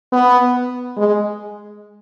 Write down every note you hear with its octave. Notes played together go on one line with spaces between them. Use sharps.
B3
G#3